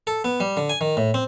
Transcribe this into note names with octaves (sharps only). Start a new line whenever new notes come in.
A4
B3
G3
D3
G#5
D#3
A2
C4